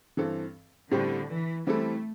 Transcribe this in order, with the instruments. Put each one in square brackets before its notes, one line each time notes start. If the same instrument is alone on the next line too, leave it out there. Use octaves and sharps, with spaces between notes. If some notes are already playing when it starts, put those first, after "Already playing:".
[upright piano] G2 E3 C4 A4
[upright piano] A2 G3 C4 G4 C5 [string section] D3
[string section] E3
[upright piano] E3 G3 C4 E4 A4 [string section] A3